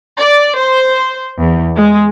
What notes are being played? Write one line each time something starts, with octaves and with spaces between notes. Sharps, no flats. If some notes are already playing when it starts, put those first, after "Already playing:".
D5
C5
E2
G#3